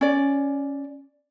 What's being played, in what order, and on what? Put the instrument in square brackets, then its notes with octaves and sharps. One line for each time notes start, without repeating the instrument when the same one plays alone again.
[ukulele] C#4 D5